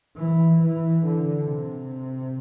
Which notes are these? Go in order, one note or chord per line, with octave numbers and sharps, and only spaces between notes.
E3
E3
D3
C3